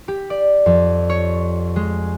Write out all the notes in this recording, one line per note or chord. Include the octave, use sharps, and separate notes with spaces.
G4
D5
F2
C#5
G#3